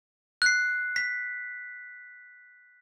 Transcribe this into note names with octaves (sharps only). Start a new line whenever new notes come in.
F#6 C7
B6